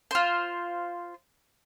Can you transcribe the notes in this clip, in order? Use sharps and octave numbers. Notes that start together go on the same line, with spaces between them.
F4 C5